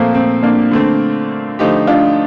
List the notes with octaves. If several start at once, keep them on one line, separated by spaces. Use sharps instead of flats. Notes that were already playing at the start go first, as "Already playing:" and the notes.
Already playing: A#2 F3 A3 A#3 C4
A3 C4
A#3 D4
D3 A3 C4
D3 F3 A3 D#4 G4
D4 F4